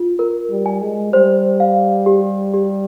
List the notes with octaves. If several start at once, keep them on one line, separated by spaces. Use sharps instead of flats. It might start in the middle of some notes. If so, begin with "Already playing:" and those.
Already playing: F4
A#4
G3
G#5
G#3
G3 C5
F5
G4
G4